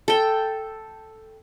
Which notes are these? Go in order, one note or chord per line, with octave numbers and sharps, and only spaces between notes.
A4 G5